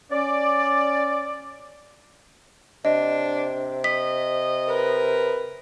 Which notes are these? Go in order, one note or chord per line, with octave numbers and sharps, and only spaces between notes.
C#4 D5
C3 D4 D#5
D#5 B6
A#4 B4